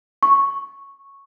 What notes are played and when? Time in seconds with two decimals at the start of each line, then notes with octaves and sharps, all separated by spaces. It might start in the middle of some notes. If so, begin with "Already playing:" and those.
0.23 C#6